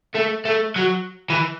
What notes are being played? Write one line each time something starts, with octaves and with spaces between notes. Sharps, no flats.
A3
A3
F#3
E3